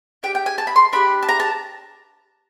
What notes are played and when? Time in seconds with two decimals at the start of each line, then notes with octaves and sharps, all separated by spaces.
0.23 D4 G4 G5
0.35 G5
0.46 G#5
0.58 A5
0.67 B5
0.76 C6
0.93 D4 G4 B5
1.23 A5
1.29 A#5
1.40 A5